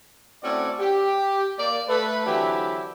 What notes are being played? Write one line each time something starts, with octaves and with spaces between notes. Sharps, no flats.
A3 C4 C#4 E4 F#4 D5
G4
A#3 D5
A3 B4
D3 E3 F#3 C4 E4 G4